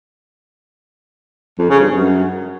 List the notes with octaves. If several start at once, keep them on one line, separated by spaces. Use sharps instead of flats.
F2
C#3
G2
F#2